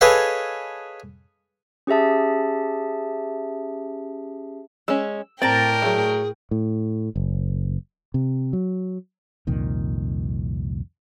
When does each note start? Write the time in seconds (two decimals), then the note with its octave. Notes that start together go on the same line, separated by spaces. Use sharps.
0.01 G#4 A4 B4 C#5 D#5 F5
1.87 C#4 G4 G#4 E5 A5
4.88 G#3 C#4 E6
5.42 A2 C4 A#4 D5 G5 A5 A#5
5.82 F#3 A3 G#4
6.51 A2
7.16 F#1
8.14 C3
8.53 F#3
9.47 C2 F2 A#2 D#3